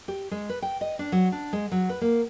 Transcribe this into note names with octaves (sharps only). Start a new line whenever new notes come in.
G4
G#3
B4
G5
D#5
D4
F#3
D4
G#3
F#3
B4
A#3